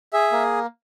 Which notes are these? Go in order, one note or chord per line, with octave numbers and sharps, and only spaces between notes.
G#4 E5
A#3